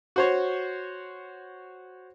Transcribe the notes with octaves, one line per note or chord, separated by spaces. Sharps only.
F#4 C5 C#5